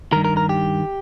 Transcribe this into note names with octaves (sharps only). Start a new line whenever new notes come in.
G2 D#3 A#4
A#4
A#4
G4